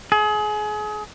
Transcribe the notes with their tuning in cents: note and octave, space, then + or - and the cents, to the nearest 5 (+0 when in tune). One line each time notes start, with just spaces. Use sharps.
G#4 +30